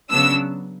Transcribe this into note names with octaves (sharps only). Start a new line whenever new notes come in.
C#3 F#3 B3 D4 E6